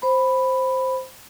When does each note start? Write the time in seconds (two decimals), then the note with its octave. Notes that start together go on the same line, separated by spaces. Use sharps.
0.02 C5 B5